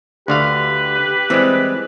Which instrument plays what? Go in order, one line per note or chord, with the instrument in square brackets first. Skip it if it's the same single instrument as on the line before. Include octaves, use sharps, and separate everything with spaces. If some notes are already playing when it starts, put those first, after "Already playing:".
[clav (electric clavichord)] D2 D3 F5 [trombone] G4 [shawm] B4
[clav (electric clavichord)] E3 G3 G#3 [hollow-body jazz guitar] C4